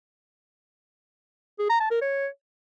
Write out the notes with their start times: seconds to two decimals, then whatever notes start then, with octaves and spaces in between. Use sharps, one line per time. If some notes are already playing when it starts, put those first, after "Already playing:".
1.59 G#4
1.70 A#5
1.80 A5
1.91 A#4
2.01 C#5